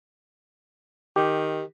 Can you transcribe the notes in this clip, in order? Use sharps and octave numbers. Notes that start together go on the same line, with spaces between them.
D#3 G4